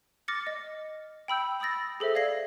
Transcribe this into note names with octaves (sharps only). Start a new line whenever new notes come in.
D6 F6 A6 A#6 C#7
D#5
G5 B5 E6 G6
B5 D#6 E6 A6 A#6
G#4 A4 C5 E5
D5 F5 G#6 A#6 C7